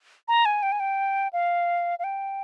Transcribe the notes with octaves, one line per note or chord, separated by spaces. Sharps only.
A#5
G#5
G5
G#5
G5
F5
F5
G5